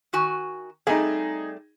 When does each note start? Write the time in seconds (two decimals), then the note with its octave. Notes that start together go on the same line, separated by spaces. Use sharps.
0.13 D#3 F#4 G#5
0.87 G3 A3 C4 D#4 G#4